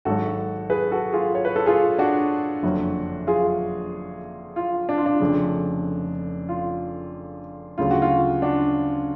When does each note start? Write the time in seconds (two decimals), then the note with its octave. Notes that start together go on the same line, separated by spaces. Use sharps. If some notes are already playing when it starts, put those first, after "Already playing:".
0.05 G#1 G#2 F#3 F#4 A4
0.70 G#4 B4
0.91 F#4 A4
1.13 F4 G#4
1.35 C#5
1.45 B4
1.56 A4
1.66 F4 G#4
1.98 D4 F#4
2.63 F#1 F2 D3 F#3
3.27 F4 G#4
4.56 F4
4.89 D4
4.97 F4
5.06 D4
5.20 F1 F2 C#3
6.49 F4
7.78 D2 C#3 F#3 F4
7.91 F#4
8.02 F4
8.42 D4 F#4